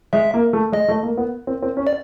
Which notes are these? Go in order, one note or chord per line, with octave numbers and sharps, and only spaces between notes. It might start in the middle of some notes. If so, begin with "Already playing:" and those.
G#3 E5
A#3
A3
G#3 D#5
A3
A#3
B3
C4
C4
C#4
D5